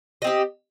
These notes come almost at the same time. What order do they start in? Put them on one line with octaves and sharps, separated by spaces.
D#5 C4 G4